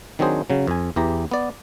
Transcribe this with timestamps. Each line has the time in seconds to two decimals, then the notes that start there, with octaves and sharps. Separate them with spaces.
0.19 D#3 F#3 C4 D4 G#4 C5
0.50 C#3 F#3
0.67 F2 G#5
0.96 E2 E3 G4 A#5
1.31 B3 D5